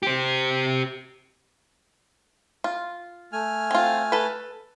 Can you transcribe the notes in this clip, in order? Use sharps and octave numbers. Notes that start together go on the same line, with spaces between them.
G4 C5
F4
A3 G#5 F6
C4 F4
A4 B4